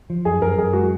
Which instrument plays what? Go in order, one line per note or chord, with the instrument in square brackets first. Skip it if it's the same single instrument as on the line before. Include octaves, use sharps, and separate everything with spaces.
[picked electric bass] F3
[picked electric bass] F#2 [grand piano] G#4
[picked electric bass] F#2 [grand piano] A#4
[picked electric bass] F#2 [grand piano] G#4
[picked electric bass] G#3 [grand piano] F#4